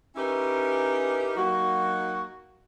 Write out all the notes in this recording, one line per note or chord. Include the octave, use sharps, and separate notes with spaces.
C#4 D#4 E4 G4 A#4 B4
F#3 A#3 D#4 F#4